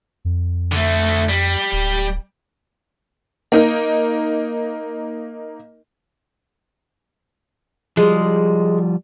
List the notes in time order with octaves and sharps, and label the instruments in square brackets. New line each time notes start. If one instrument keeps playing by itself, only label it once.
[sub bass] F2
[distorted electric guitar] D3 A3
G3
[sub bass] D1
[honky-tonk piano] A#3 D#4 A#4
[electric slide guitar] F3 G3 [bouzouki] G#3